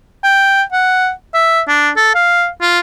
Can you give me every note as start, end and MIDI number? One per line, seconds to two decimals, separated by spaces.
0.24 0.63 79
0.72 1.11 78
1.34 1.61 76
1.68 1.90 62
1.97 2.13 69
2.15 2.48 77
2.61 2.80 65